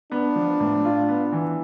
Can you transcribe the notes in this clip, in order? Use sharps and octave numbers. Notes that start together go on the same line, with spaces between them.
B3 D4
F3
A2
F4
B3
E3